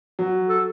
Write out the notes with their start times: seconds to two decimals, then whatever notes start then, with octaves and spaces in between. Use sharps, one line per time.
0.19 F#3
0.49 A4